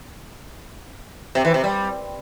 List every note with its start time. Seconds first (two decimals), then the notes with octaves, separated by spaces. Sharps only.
1.35 C3
1.45 E3
1.54 C3
1.64 G3